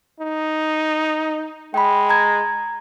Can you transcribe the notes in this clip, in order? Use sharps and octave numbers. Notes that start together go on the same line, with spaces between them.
D#4
G#3 G5 B5
A#5 G#6